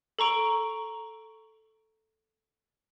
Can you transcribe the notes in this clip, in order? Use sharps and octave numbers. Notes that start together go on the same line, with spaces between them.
A4 A#5 C#6 D7